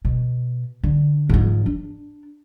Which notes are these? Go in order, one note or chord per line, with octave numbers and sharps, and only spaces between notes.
B2
D3
G#2 F3
D4